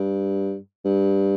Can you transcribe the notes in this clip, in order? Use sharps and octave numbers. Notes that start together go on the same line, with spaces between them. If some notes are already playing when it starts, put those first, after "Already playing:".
Already playing: G2
G2